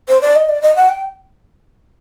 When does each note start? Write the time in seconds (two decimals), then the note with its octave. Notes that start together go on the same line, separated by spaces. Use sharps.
0.08 C5
0.21 D5
0.35 D#5
0.49 D5
0.62 D#5
0.76 F#5
0.89 G5